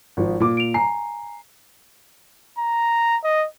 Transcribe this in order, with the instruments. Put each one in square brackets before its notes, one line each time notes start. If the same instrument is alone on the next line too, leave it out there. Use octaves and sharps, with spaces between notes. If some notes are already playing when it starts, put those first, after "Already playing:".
[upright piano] G#1 F3
A#2 D6
[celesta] D7 F7
[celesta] G#5 A#5 [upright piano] C7
[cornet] A#5
D#5